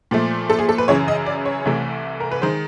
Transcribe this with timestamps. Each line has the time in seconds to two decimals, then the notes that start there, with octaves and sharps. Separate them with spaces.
0.11 A#2 F3 A3
0.50 A4
0.59 G#4
0.69 A4
0.78 B4
0.88 F#2 C#3 E3 C#5
1.08 D#5
1.26 D5
1.45 C#5
1.65 C2 C3 E3 A3
2.20 A#4
2.31 B4
2.42 D#3 G#3 C5